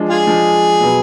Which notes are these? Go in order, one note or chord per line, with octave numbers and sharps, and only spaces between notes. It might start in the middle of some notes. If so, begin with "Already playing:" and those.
Already playing: F3 G#3 D4
F4 G#4
F3 G#3 D4
B2 F#3 B3